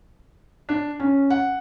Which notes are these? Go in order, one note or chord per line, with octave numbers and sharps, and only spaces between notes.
D4
C#4
F#5